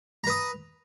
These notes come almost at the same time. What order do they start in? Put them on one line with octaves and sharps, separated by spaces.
A#5 B4 D#6